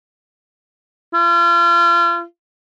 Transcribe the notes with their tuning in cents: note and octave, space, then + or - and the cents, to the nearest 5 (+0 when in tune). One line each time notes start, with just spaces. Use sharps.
F4 -35